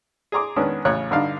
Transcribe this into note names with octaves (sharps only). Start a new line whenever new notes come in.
G#4 D5 A#5 C6 D6
D#3 G#3 B3 C#4 D4
A1 A2 C#3 C#5 F#6
G2 D3 D4 D#4 F5